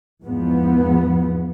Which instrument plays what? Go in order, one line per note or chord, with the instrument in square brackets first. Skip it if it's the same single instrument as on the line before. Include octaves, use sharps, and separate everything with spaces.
[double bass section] E2 G#2 F3 B3